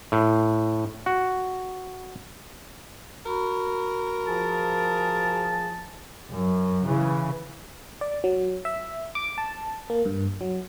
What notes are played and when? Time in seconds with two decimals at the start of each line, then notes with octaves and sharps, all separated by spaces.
0.12 A2
1.06 F#4
3.26 F#4 A#4 B5 C#6
4.27 F3 G#4 A5
6.31 F#2
6.85 C#3 E3
8.01 D5
8.24 F#3
8.65 E5
9.15 D6
9.38 A5
9.90 A#3
10.06 G2
10.41 F#3